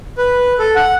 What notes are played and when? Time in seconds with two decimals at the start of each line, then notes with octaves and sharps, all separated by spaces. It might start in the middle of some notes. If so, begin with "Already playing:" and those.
0.18 B4
0.59 A4
0.76 F#5